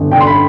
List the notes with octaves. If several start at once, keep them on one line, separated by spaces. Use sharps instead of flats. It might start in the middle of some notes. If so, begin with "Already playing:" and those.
Already playing: G1
D3 G5
C6
B5